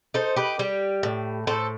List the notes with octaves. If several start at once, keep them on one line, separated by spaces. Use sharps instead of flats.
D#4 A4 C5
G4 B4
G3 G4
A2
A2 A4 C5